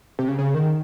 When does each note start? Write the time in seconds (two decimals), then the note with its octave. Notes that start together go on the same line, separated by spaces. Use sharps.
0.19 C3
0.28 C#3
0.39 C#3
0.54 D#3